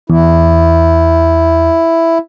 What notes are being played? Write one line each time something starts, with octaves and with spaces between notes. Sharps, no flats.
E2 E4